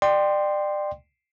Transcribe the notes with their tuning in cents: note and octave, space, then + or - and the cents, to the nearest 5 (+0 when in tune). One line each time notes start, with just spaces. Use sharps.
D5 +30 G5 +0 C6 +0